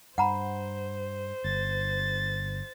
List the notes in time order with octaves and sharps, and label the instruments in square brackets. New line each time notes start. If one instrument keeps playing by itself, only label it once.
[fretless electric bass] G2 [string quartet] C5 [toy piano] F#5 A#5 B5
[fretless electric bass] G1 [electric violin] A6